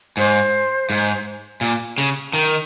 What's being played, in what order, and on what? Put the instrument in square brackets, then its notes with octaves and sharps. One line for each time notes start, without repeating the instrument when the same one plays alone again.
[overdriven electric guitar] G#2 [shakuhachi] C5
[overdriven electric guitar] G#2
A#2
C#3
D#3